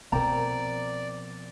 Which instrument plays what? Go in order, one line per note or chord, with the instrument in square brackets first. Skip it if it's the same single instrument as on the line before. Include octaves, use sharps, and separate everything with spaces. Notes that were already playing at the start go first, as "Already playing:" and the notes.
[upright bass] B2 F3 [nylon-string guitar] C4 A#4 [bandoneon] D5 [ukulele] A#5